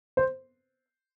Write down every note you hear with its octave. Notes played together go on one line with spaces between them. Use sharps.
C5